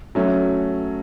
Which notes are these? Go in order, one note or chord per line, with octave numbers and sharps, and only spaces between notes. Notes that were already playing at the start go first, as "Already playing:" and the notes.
F#3 A3 C#4